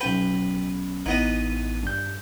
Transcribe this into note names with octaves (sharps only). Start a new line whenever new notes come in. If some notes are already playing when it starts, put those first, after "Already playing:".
B1 C#4 B4 G5 B5
A1 E3 B3 D#4 D#5
G2 G6